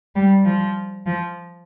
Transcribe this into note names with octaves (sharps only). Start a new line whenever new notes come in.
G3
F3
F3